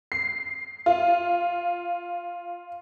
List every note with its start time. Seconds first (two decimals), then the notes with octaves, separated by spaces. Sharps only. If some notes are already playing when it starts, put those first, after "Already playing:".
0.12 C7
0.86 F4